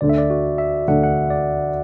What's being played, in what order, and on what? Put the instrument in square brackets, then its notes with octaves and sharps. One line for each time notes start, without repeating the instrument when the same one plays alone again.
[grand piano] D2 D3 A3 D4 [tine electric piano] D5
[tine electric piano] E5
D5
F#4
E5
[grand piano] D2 D3 A3 D4 [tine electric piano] F#5
[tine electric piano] F#5
D5